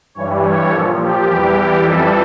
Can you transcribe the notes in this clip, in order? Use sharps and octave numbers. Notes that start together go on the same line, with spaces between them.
G2 E3 G3 C#5
C#5
A#2 F3 A4
G4
E2 E3 G3 G4
F2 E3 G3 A4